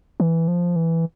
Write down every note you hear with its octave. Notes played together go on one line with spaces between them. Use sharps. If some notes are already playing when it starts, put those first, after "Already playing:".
E3
F3
E3